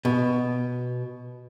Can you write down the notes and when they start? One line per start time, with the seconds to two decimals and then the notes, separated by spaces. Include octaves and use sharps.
0.05 B2